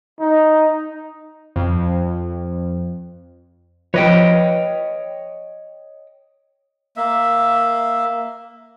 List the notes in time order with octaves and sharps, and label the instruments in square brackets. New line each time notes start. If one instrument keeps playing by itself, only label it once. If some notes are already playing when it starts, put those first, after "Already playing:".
[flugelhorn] D#4
[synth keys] F2
[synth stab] F3 B4 [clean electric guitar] C#5 D#5 G5
[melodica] A#3 E5